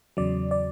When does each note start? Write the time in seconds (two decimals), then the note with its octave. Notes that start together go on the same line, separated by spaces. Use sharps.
0.17 E2 C#3 F#3 D5
0.51 D5